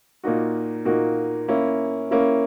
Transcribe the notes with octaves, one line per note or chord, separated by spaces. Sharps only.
A#2 A#3 D#4 F#4
A#2 A#3 D#4 F#4
A#3 C#4 E4
A#3 C#4 E4